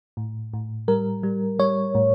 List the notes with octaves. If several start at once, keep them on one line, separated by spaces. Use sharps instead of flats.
A2
A2
G3 A#4
G3
G3 C#5
A2